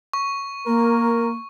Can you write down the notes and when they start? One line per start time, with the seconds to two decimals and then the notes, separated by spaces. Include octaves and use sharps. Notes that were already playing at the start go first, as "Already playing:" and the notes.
0.13 C#6
0.67 A#3 A#4